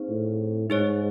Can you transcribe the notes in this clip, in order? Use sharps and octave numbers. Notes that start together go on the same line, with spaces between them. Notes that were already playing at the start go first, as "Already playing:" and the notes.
Already playing: C4 D#4 G#4 C5
A2
G#2 D#4 G#4 C#5